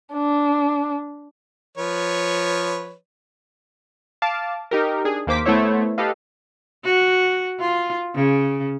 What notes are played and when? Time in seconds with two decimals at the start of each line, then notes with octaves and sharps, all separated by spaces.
0.14 D4
1.78 F3 B4 C#5
4.22 F5 A5 D6
4.71 D#4 G4 A#4
5.04 D4 G#4
5.27 D#2 A#3 C5 D6 B6
5.45 A3 B3 E4 C5 C#5 E5
5.98 G4 A4 B4 D#5 F5
6.84 F#4
7.60 F4
8.15 C#3